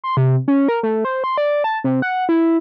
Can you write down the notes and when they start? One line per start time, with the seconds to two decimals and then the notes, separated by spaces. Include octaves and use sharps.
0.04 C6
0.17 C3
0.48 C#4
0.68 A#4
0.83 A3
1.05 C5
1.24 C6
1.38 D5
1.64 A5
1.84 C3
2.02 F#5
2.29 E4